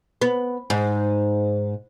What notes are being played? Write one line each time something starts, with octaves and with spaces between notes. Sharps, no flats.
B3
G#2